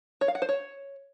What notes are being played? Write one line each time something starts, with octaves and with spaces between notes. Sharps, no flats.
C#5
F5
F#5
C5
C#5